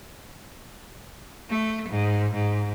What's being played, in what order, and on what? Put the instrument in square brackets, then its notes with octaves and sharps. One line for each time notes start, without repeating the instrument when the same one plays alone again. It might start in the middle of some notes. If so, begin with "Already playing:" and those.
[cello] A3
G#2
G#2